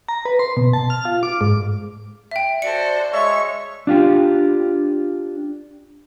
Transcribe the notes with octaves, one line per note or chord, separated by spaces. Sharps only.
A#5
B4
C6
B2
A5
F6
F4
D6
G#2
E5 G5
F#4 A4 C5 D5 C#7
G#3 C#5 D#5 E5 C#6
D4 F4 G4